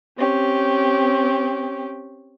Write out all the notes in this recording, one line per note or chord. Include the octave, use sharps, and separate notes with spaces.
C4 C#4 G4